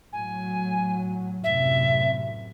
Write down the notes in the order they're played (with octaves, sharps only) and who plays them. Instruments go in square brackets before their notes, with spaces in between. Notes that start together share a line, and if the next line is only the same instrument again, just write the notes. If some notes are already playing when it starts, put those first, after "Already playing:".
[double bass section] A2 F#3 [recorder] G#5
[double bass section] F#2 A2 C3 [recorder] E5